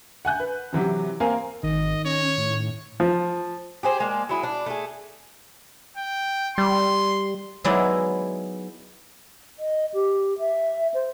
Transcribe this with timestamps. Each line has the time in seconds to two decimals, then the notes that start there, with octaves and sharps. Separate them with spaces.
0.25 F#5 G#5 F#6 G6
0.40 B4
0.73 C3 E3 F#3 G4
1.20 A#3 C4 A#4 F5 G#5
1.63 G#1 D#3 D#5
2.05 C#4 C#5
2.38 A2
3.00 F3
3.83 G4 G#4 C5
4.00 G#3 A#3 D4
4.29 F#3 E4 G#4
4.43 D4
4.66 A3 G#4
5.97 G5
6.58 G3 C6
7.64 F#3 G#3 B3 D#4 E4 D5
9.59 D#5
9.94 G4
10.39 E5
10.94 C5